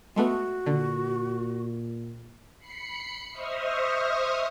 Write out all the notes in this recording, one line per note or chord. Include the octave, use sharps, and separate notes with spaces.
G#3 A3 B3 F#4
A#2 D3
B5 C7 C#7
C5 D#5 E5 C#6 D#6 F6